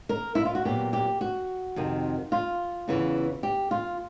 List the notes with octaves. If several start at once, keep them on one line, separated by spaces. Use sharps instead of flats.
A#4
E4
F4
F#4
A#2 F#3 B3 G4
G4
F#4
F2 C3 D#3
F4
E2 C#3 E3
G4
F4